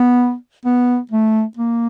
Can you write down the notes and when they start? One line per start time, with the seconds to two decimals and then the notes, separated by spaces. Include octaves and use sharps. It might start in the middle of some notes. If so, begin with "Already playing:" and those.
Already playing: B3
0.66 B3
1.11 A3
1.57 A#3